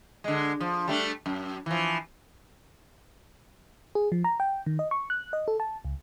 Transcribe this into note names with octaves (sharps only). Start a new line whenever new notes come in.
D3 G#3
F3
G3 A3 D4
F#2
E3 F3
G#4
F3
A#5
G5
D#3
D#5
C#6
F#6
D#5
A4
A5
C#2